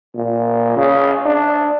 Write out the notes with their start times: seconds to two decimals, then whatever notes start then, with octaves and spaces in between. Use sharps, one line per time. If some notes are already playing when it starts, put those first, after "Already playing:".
0.15 A#2
0.76 C#3
1.26 D4